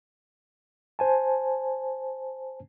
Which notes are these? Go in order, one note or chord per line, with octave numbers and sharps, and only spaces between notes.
C5 G#5 A5